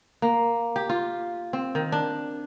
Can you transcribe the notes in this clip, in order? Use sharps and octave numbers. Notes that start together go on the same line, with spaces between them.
A#3
G4
F4
C4
D#3
D4